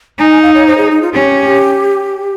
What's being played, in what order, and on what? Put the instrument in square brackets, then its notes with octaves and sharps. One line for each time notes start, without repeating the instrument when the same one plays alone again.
[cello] D#4 [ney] G#5
[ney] G#5
F5
C#5
C5
G#4
D#4
F4
[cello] C#4 [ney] G4